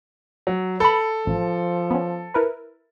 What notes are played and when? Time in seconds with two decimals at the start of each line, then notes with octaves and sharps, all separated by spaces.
0.47 F#3
0.80 A4 B4 B5
1.27 A1 F3
1.91 B3 C#4
2.34 E4 A#4 B4